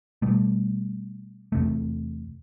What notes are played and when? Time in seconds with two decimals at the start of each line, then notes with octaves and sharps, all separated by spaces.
0.22 B2 G3 A3
1.52 E2 C3 A3